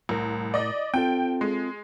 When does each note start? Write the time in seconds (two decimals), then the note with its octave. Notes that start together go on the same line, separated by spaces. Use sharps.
0.09 C2 A2 A#4
0.54 D5 D#5
0.94 C4 F4 A4 G5
1.41 G#3